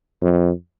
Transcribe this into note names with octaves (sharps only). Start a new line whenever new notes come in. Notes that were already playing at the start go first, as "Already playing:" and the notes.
F2